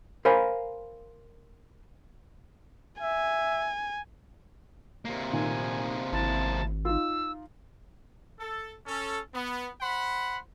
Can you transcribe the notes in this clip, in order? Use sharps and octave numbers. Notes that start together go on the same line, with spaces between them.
A#4 C5 F5 G#5 B5
E5 G#5
C3 A#3
A#2 D#3 G#5
G#1 E4 A5
D#4 F4 E6
A4
C#4 A4
B3
C5 F#5 B5